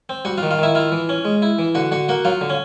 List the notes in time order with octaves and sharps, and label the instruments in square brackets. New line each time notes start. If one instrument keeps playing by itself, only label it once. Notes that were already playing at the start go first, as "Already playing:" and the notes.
[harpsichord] C4
G3 F#4 F#5
F4 F5
D#3
F4 F5
D#3 E4 E5
E4 F4 F5
E3
C#4
G#3
E4
E3
D3 F#4 F#5
D3 F#4 F#5
A#3 F#4 F#5
F#3 F4 F5
D3
C#4